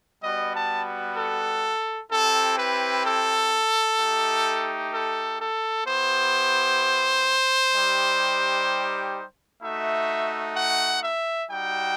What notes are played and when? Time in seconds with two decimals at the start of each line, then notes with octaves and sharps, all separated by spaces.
0.24 G3 B3 F#4 D#5
0.55 A5
1.17 A4
2.12 C4 E4 G4 A4
2.58 B4
3.06 A4
3.99 A3 D#4 G4
4.93 A4
5.40 A4
5.87 B3 E4 G4 C5
7.75 G3 D#4 G4
9.62 A3 D#4 F#4 E5
10.56 F#5
11.03 E5
11.50 G3 D#4 F#4 G5